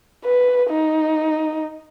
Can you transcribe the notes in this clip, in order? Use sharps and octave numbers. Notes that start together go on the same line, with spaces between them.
B4
D#4